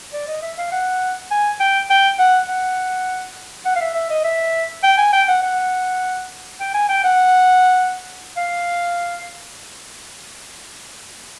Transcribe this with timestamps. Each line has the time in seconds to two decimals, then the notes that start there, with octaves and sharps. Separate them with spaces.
0.13 D5
0.28 D#5
0.42 E5
0.58 F5
0.72 F#5
1.31 G#5
1.60 G5
1.90 G5
2.19 F#5
2.48 F#5
3.65 F#5
3.75 F5
3.81 E5
3.95 E5
4.10 D#5
4.24 E5
4.83 G5
4.98 G#5
5.13 G5
5.28 F#5
5.42 F#5
6.60 G5
6.74 G#5
6.89 G5
7.04 F#5
8.37 F5